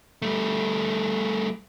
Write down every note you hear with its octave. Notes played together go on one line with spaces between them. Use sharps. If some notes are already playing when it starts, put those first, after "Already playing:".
G3 A3